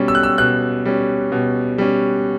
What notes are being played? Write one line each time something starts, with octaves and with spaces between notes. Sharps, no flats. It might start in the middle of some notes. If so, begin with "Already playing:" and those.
Already playing: B2 G3 C#4
E6
F#6
E6
B2 F#6
G3 C#4
B2
G3 C#4